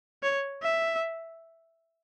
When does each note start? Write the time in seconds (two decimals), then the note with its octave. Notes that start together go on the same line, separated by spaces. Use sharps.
0.23 C#5
0.63 E5